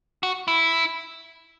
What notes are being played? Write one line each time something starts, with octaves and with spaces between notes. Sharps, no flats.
F#4
E4